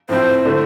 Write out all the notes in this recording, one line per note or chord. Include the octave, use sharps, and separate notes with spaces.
A2 F3 C4 E4 C5
D3 A3 E4